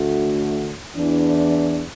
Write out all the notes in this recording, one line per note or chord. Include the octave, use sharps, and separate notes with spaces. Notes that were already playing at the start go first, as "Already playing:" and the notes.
Already playing: D2 D3 A3 F#4
E2 E3 D4